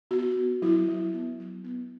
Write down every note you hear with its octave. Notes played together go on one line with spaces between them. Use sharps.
B3 F#4
B3
F#3 E4
F#3
B3
F#3
B3